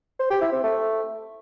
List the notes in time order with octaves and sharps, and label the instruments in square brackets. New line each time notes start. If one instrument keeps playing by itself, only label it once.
[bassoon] C5
G4
E4
C4
A3